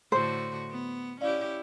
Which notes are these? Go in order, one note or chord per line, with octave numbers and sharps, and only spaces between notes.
A2 D3 F#4 C5
B3
C#4 E4 G4 D5 F5